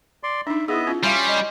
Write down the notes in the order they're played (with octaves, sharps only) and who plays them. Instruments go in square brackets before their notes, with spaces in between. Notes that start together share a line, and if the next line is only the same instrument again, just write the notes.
[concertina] D5 C6
[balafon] D4 D#4 [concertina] E5
[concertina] B3 D#5 E5 [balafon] E4 G#4
[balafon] C#4 F4
[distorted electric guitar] G3 [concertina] C#4 C6 [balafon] C#5 E5 F5
[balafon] D#5